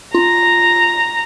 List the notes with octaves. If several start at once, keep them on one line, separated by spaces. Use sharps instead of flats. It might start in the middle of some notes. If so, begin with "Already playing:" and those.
F4 A#5